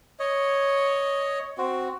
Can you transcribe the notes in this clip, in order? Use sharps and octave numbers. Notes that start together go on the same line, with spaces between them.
C#5 D#5
C4 F#4